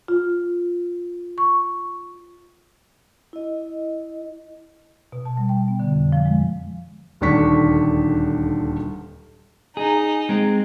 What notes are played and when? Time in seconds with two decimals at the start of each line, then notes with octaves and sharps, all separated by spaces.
0.08 F4
1.38 C#6
3.33 E4 D#5
5.12 B2
5.25 A5
5.37 G3
5.49 G5
5.68 B3
5.80 D3
5.92 F2
6.12 F3
6.26 G#3
7.21 D#1 D2 D#3 D4 C#6 B6
9.77 D#4 G#4
10.29 G#3 C4